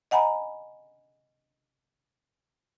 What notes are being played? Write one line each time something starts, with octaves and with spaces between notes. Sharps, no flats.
D#5 F#5 G#5 A#5 B5